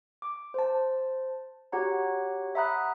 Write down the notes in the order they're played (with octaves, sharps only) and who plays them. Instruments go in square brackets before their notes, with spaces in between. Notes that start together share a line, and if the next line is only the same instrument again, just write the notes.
[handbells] D6
C5 A5
F#4 G4 C#5 F#5 A#5
E5 F#5 A#5 B5 D#6 F#6